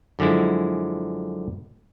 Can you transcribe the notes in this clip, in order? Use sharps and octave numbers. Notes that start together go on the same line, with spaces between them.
F#2 D3 F3 G#3 E4